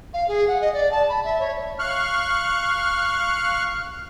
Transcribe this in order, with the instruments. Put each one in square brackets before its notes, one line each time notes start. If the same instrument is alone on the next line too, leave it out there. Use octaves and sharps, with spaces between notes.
[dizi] F5
G#4
F#5
D#5
D5
A5
B5
E5
C#5
[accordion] F5 C#6 F6 F#6